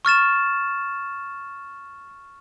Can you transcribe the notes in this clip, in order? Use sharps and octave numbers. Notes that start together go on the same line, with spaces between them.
C#6 F6 A6 E7